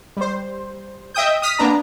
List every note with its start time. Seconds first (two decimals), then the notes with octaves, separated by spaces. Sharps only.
0.17 G3 C5
1.14 D#5 E5 G5 D#6 G6
1.42 D#6 F6 B6
1.59 A#3 B3 D4 A#5